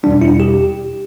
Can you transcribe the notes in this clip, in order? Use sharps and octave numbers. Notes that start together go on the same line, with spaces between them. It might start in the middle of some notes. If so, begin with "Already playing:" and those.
E2 B2 G3 D4
E4
G4